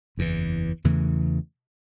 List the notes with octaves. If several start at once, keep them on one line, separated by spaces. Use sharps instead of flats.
F#1 E2 C#3 E3
E2 C#3 E3 A3